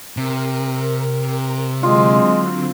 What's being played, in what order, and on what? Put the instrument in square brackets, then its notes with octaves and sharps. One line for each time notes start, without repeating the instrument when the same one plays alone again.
[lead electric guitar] C3 [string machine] A#4
[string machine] D3 F#3 C4 [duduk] G#3 [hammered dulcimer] F4